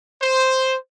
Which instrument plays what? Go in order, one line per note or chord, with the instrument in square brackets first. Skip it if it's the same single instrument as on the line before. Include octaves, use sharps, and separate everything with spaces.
[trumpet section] C5